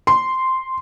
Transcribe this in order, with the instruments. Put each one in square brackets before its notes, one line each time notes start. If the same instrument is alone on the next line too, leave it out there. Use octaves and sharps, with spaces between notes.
[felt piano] C6